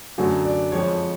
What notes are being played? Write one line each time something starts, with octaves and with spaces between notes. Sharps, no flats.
F#2 D3 F#3 A3 F#4
D5
F2 F3 G#3 C#5